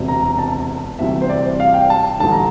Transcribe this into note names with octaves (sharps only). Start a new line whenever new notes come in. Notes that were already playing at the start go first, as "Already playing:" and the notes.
Already playing: E1 D2 C3
A#5
A5
D2 C3 E3 G3 E5
C5
D5
F5
G5
A5
A1 G2 D3 A5
A#5